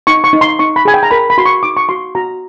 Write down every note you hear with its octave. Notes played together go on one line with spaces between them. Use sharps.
D#4 C#6
C#6
D#4
C6
D#4 C#6
B5
G#4 G#5
G5
A#5
A#4 B5
B5
F#4 C6
C#6
D#4 D6
C#6
F#4 C6
F#4 A#5